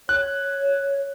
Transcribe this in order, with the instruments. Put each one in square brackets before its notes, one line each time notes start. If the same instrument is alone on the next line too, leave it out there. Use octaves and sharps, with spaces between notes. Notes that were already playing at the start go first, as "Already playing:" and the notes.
[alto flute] C#5 [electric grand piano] F#6